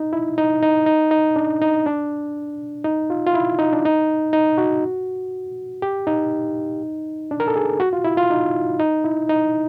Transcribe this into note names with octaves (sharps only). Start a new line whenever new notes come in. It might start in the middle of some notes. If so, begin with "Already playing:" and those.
Already playing: D#4
E4
D#4
D#4
D#4
D#4
D4
D#4
D4
D#4
F4
F4
E4
D#4
D4
D#4
D#4
F#4
G4
D#4
D4
A#4
A4
G#4
F#4
F4
E4
F4
D#4
D#4
E4
D#4